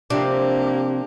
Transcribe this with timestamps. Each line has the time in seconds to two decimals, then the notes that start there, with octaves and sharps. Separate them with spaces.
0.10 C3 F3 A#3 D4 G4